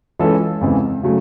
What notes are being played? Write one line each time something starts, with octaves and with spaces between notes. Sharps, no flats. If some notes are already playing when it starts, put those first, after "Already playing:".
E3 G#3 C#4 F4 A4
E2 C#3 E3 G#3 C4
C#3 F#3 A3